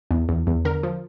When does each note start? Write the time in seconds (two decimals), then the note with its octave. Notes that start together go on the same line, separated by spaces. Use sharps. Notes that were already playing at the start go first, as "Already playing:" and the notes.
0.11 E2
0.29 E2
0.47 E2
0.65 D3 A#4
0.83 F3